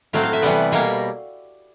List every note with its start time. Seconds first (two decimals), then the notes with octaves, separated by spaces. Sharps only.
0.13 A2 F#3 A3 C4 F5
0.23 F5
0.33 E5
0.42 C3 E3 G3 B3 D5
0.72 B2 G3 A#3 C#5